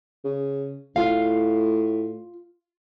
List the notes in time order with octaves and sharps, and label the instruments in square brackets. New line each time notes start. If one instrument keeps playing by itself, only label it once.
[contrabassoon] C#3
[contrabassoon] A2 [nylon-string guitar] F4 F5